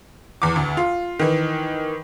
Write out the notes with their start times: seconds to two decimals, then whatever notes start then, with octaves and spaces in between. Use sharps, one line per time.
0.42 E2 D6
0.56 D2
0.77 F4
1.19 D#3 E3